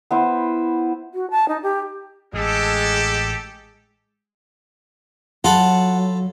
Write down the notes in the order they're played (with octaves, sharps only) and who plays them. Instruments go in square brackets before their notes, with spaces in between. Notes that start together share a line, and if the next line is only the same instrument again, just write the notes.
[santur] B3 E4 C5
[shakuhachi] F#4
A5
D#4
G4
[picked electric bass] A1 [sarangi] G#3 [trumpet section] G4 A4
[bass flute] F#3 [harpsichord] F4 A4 B5 [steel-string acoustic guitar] F#5